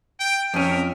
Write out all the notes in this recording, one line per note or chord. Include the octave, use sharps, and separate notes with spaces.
G5
F2 C#4 A#4 E5